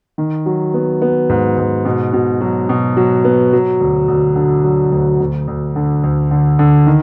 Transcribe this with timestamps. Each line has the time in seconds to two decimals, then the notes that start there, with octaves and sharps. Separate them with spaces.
0.18 D#3
0.46 F#3
0.74 B3
1.02 B3
1.30 G#2
1.58 G#2
1.85 B2
2.13 B2
2.41 F#3
2.69 B2
2.97 F#3
3.25 B3
3.53 F#3
3.80 D2
4.08 D2
4.36 D3
4.64 F#3
4.92 D2
5.20 D2
5.48 D2
5.76 D3
6.03 D2
6.31 D3
6.59 D3
6.87 D#3